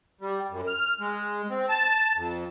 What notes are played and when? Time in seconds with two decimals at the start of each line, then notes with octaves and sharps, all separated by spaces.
0.21 G3
0.50 F#2
0.68 F6
1.00 G#3
1.50 C4
1.69 A5
2.16 F2